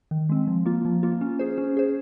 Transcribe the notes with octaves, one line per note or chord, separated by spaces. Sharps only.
D#3
G#3 C4
F3
A#3 F4
F3
A#3 F4
C#4
G#4 C5
C#4
G#4 C5